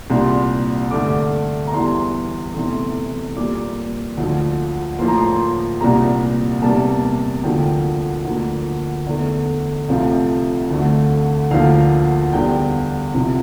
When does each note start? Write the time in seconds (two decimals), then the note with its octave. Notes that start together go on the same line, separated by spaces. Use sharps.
0.10 C2 A#2 G3 C6
0.91 G2 D3 A3 D6
1.67 A#5
1.73 E2 E3 G3 C6
2.54 E2 C3 E3 A3 C6
3.36 A#2 G3 A#3 D6
4.17 D2 D3 F3
4.99 A2 F3 A#3 C6
5.08 A#5
5.18 C6
5.81 C2 A#2 G3 A#3 A#5
6.62 E2 C3 G3 A#3 A5
7.43 D2 D3 F3 A#3 G5
8.25 D2 D3 F3 A#3
9.07 E2 D3 A3
9.88 C2 C3 F3 A3 F5
10.70 D2 D3 A3
11.51 D2 D3 F3 A#3 F5
12.33 E2 D3 G3 G5
13.14 C2 C3 F3